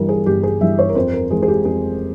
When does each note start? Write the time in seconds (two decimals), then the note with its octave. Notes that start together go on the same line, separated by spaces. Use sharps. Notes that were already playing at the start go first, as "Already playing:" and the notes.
Already playing: G1 G2 E3 G3 A#4
0.09 G#4
0.26 G1 G4
0.43 G#4
0.61 G2 E3 G3 E5
0.79 C#5
0.89 A#4
0.95 F2 C5
1.13 A#4
1.30 E3 G#3 G#4
1.42 G#4
1.48 G4
1.65 F2 G#4